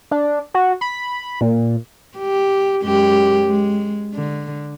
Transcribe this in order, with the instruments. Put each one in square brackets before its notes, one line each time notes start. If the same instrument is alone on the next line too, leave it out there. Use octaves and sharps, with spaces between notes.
[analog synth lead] D4
F#4
B5
A#2
[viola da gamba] G4
F#2 G#3 G4
G#3
D3